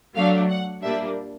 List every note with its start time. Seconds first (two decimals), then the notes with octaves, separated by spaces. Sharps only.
0.15 F#3 A3 D4 F5
0.49 F#5
0.82 A#2 G3 A#3 D4 E5